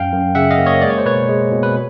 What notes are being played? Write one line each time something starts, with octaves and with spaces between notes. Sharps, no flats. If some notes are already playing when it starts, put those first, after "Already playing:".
Already playing: F#2 F5 G5
F#2
C#3 E5 F#5
D#5 F5
A#3
C#5 D#5
G#3 D5
C#5
C5
B2 B4 C#5
G#3
B2
B4